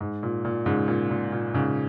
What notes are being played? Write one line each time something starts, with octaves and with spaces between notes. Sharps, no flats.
G#2
A#2
A#2
G#2 C#3
A#2
A#2
A#2
G#2 C#3